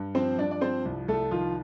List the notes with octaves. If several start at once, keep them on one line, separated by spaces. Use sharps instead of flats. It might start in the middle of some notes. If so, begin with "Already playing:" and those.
Already playing: G2
F3 C4 C5
G2 D4 D5
D5
F3 C4 C5
C2
C2 A3 A4
D#3 F3 F4